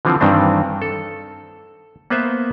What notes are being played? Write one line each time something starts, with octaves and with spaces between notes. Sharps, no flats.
D3 E3 F3 C4
G2 D#3 E3 C4 D4
A4
A#3 B3 B4 C5 E5